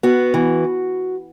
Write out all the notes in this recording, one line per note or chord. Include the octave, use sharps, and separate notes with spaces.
B3 F#4
E3